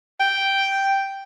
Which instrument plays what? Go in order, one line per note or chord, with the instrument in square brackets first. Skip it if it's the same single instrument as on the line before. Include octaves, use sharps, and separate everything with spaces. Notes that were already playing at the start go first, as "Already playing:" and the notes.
[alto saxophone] G5